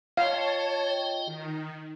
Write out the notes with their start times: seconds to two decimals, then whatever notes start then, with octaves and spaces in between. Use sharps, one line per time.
0.17 F4 C#5 D#5 F5 G5 A5
1.26 D#3